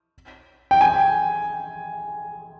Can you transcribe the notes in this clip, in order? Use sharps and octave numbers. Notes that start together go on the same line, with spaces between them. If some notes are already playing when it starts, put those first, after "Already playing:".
G5
G#5